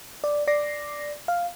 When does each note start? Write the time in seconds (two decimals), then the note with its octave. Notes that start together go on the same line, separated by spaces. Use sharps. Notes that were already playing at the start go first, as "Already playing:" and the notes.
0.24 D5
0.47 D5 D6 A#6 C7
1.28 F5